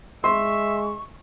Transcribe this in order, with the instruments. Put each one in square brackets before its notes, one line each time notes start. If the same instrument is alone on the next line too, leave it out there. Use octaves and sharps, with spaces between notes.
[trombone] G#3 [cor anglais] E5 [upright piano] C6 [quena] C#6